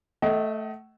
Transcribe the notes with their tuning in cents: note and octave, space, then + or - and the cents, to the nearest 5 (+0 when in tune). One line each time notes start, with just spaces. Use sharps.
A3 +0 D#5 +25 F#5 +40